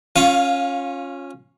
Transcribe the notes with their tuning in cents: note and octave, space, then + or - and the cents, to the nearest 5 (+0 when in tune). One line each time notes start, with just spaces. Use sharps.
C#4 -10 F4 +20 F5 +0